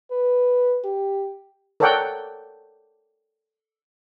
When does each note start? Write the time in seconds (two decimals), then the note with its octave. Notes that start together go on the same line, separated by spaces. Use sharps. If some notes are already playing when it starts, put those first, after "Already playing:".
0.11 B4
0.84 G4
1.80 A4 A#4 C#5 D5 F#5 G5